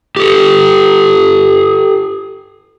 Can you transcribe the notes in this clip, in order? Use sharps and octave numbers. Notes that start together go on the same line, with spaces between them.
G4 A4